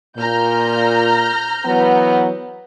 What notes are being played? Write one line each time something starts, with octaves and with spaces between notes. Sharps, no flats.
A#2 A#5 F6 G6
E3 F#3 B3